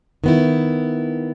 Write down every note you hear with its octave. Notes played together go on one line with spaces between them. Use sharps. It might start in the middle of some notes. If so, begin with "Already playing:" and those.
D#3 B3 E4